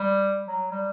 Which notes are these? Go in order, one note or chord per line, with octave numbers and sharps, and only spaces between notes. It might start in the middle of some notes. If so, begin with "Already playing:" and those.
Already playing: G3
F#3
G3